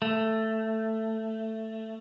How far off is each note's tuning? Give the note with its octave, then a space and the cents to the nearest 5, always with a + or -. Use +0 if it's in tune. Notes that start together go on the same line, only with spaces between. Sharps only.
A3 +10